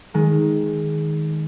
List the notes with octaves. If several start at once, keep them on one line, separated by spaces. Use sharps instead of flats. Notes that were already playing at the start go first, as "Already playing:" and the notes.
D#3 G#3